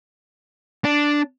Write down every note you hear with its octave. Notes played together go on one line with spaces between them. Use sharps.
D4